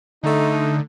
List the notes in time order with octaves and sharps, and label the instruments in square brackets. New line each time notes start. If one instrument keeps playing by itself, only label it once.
[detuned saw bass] D3 [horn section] A3 D#4